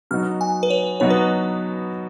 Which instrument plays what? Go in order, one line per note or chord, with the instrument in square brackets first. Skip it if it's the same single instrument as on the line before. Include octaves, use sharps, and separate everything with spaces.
[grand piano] B2 F#3 B3 D#4 F#4 [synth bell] F6
[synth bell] G#5
B4
C#5
[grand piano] B2 F#3 B3 D#4 F#4 [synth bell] C#5
[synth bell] B4